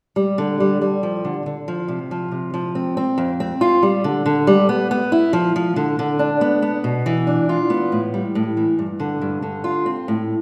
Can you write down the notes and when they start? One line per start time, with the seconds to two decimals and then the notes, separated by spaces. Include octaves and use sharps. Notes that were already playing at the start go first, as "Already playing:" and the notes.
0.16 G3
0.38 D3
0.60 G3
0.82 G3
1.03 F3
1.25 D3
1.46 D3
1.68 F3
1.88 C3
2.11 F3
2.31 C3
2.54 F3
2.75 C4
2.97 C4
3.18 F2
3.40 C4
3.61 F4
3.83 G3
4.04 D3
4.26 D3
4.47 G3
4.69 B3
4.91 B3
5.12 E4
5.33 F3
5.56 F3
5.76 D3
5.99 D3
6.19 D4
6.41 B3
6.62 B3
6.84 B2
7.06 E3
7.27 D4
7.49 F4
7.70 B3
7.92 A2
8.14 G3
8.35 A2
8.57 E3
8.79 G2
9.00 D3
9.21 G2
9.42 D3
9.64 F4
9.86 C4
10.08 A2